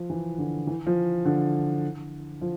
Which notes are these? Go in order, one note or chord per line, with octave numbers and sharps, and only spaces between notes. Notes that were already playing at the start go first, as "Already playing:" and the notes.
Already playing: F3
E3
D3
E3
F3
D3
F3